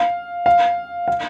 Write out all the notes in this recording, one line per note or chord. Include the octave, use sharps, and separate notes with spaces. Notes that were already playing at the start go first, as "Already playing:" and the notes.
Already playing: F5
F5
F5